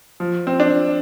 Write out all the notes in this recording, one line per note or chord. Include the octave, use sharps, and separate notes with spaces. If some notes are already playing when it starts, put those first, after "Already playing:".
F3
C4
D4